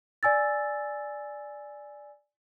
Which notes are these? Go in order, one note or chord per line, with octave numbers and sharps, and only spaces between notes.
D5 G#5 E6 A6